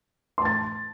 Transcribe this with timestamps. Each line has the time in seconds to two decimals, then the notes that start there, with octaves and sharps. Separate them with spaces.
0.38 C6
0.42 A5
0.45 A6